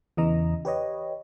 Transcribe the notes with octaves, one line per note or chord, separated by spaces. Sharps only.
E2 C#3 E3 D#5 A#5
G4 B4 C#5 D#5